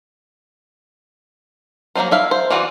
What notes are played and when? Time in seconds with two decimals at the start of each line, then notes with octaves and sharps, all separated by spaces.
1.95 F#3 A#3 C4 D#4 C5
2.11 E4 E5 F5
2.31 C5
2.50 E3 F4 F#4 D5